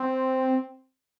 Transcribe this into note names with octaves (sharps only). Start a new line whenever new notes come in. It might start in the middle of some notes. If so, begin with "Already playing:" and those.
Already playing: C4